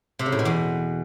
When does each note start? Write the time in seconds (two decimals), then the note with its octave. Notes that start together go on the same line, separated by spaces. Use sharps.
0.19 C3
0.26 C#3
0.32 A2
0.39 B2
0.45 E2